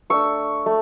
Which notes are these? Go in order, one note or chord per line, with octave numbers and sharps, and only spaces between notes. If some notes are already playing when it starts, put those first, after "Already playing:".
A3 D4 C#6 E6
A3